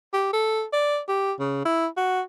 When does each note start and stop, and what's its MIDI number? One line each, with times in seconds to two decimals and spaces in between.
0.13 0.33 67
0.33 0.63 69
0.73 0.99 74
1.08 1.32 67
1.39 1.62 49
1.65 1.87 64
1.97 2.21 66